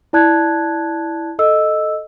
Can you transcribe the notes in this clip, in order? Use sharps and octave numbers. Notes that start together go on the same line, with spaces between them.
E4 D5 A5 F#6 G#6
A4 D#5 E6